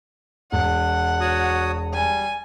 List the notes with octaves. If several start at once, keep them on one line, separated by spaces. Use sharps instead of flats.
E1 F#5
F#4 C#5 D#6
G3 G#5